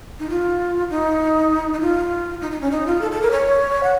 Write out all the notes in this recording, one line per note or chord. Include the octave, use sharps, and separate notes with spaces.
D#4
F4
D#4
D#4
F4
D#4
D#4
C#4
D#4
F4
A4
A4
A#4
C#5
F#5